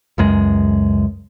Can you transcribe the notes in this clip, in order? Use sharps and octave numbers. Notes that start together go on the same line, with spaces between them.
C#2 F#2 G#3